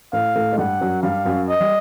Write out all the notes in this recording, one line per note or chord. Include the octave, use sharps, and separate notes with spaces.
A2 A3 F5
A2 A3
G#3
G2 G3 F#5
F#2 F#3
G2 G3 F5
F#2 F#3
D#5
G3